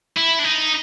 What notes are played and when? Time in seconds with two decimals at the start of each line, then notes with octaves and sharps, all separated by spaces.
0.17 E4
0.39 D4
0.44 D#4